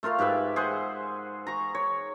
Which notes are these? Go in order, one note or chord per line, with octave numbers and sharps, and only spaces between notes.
A3 F4 A#4 F5
G#2 G4 B4 E5
G#4 C5 F#5
A#5 C#6
C#5